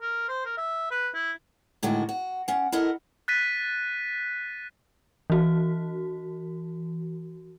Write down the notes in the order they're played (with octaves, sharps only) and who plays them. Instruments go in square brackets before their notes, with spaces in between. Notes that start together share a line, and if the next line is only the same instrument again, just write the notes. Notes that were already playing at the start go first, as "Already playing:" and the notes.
[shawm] A#4
C5
A#4
E5
B4
E4
[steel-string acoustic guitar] A2 D3 D#3 G#3 F#4
F#4
C#4 F#5
E4 A4 A#4 D#5 F#5
[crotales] F#6 A6 B6 D#7
[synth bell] E3 F#4